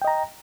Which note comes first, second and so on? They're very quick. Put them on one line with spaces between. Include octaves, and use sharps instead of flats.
G5 D#5 A#5